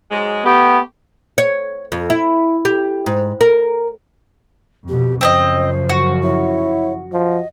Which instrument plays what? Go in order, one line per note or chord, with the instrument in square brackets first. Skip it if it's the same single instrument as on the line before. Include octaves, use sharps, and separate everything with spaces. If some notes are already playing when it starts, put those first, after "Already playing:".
[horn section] G#2 F#3 G#3
[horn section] A3 G4 [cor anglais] B3
[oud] C#5
F2
E4
G4
G#2
A#4
[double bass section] F2 B2 [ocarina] G4
[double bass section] F#2 C#3 F3 [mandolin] C4 D5 D#5 [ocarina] C5
[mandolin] F#4
[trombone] E4 [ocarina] C#5
[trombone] F3 [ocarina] D#5